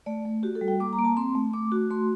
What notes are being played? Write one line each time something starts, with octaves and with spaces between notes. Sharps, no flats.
A3 D5
A3
F#4 G4
A4
G3
G5
A#3 D6
A#5
A#3
A5
C4 C6
A3
A3 D6
F#4
A3 C6